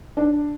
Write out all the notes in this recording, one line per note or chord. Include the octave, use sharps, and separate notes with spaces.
D4